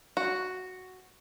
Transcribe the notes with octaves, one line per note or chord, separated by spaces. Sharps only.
F#4